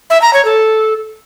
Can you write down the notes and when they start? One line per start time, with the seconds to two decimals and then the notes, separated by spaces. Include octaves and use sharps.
0.10 E5
0.22 A#5
0.33 C#5
0.45 A4